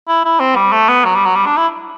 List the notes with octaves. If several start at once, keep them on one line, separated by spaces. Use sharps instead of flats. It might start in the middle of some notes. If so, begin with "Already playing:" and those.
E4
E4
C4
G3
A3
B3
F#3
G3
F#3
G3
D4
E4